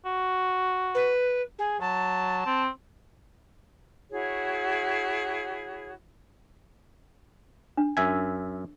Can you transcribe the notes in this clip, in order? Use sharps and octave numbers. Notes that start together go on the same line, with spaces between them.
F#4
B4
G#4
F#3 A5
C4
E4 F#4 G#4 C#5
D4
F#2 E5 G#5